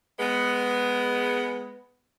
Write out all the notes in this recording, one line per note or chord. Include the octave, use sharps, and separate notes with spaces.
G#3 B3